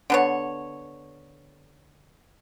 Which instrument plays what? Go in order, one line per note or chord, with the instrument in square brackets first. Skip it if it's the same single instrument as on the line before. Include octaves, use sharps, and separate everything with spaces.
[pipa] D3 B3 C#5